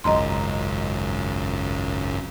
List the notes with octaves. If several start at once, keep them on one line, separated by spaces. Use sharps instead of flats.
G#1 C#2 F#2 D#5 A#5 C6